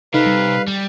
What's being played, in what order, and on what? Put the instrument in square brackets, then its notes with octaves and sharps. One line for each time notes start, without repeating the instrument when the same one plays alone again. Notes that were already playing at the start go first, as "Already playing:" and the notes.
[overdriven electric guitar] C3 [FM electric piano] D#4 A4 [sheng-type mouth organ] B4 F5
[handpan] G3
[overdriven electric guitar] G3